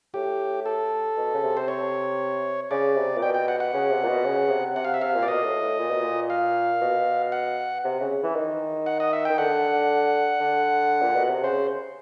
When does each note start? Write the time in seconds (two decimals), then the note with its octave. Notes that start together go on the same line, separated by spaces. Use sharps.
0.14 A2 G4
0.66 A4
1.17 B2
1.34 C#3
1.43 C3
1.57 C5
1.68 C#5
2.71 C#3 D5
2.96 C3
3.17 A#2
3.22 B2 G5
3.34 G5
3.48 F#5
3.60 F#5
3.74 C#3
3.91 C3
4.04 A#2
4.08 B2
4.25 C#3
4.50 C3
4.76 C3 F#5
4.85 F5
4.94 E5
5.01 C3 F5
5.15 A#2
5.23 D5
5.27 B2 D#5
5.44 A2
5.61 A2
5.79 A#2
5.90 B2
6.00 A#2
6.30 F5
6.81 B2
7.32 F#5
7.84 C3
8.00 C#3
8.23 E3
8.35 D#3
8.86 F#5
9.00 D#5
9.13 E5
9.25 D#3 G5
9.38 D3 F#5
10.40 D3
11.01 A#2
11.16 B2
11.29 C3
11.43 C#3 C5